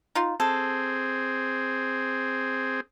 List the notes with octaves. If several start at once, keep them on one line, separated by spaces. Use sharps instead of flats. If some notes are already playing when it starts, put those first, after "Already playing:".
D#4 F4
C4 G#4 A4